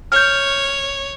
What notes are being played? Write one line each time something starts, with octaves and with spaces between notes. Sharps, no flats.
C#5 F6 G6